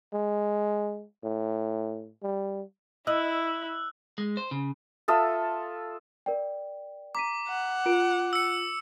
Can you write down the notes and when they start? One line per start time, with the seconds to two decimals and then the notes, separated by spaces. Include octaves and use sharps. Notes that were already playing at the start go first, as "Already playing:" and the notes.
0.14 G#3
1.24 A2
2.23 G3
3.07 E4 D#5 E6 F#6 F#7
4.18 G#3
4.37 C5
4.51 C#3
5.08 F4 A4 E5 D#6
6.26 A#4 D5 G5
7.15 A#5 D6 B6 D#7
7.48 F#5
7.86 F4 A#4 D7
8.33 E6 C#7